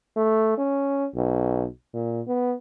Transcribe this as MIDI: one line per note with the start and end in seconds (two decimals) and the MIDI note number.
0.17 0.53 57
0.58 1.07 61
1.15 1.66 35
1.94 2.21 46
2.28 2.54 59